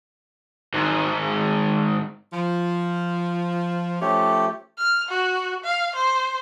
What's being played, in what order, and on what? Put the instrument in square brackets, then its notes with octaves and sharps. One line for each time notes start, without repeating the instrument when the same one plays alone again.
[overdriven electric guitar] G#2 D#3
[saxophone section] F3
[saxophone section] F3 C#4 C#5 [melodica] A3 G4
[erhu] F6
F#4
F5
C5